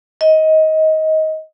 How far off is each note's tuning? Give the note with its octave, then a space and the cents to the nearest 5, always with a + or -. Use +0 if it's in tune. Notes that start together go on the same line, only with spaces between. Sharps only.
D#5 +20